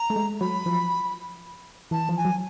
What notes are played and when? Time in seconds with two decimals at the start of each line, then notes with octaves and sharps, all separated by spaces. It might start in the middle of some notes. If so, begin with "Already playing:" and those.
Already playing: A#5
0.10 A3
0.16 G#3
0.41 F#3 B5
0.66 F3
1.91 E3 A5
2.09 F3
2.17 G#5
2.25 F#3